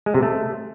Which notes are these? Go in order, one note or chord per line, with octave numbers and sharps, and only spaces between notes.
G#3
C3
A3